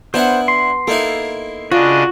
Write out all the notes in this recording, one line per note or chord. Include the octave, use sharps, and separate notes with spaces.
B3 D4 E4 C5 F#5
C6
A#3 D#4 E4 A4
C#3 D4 F4 F#4 D#5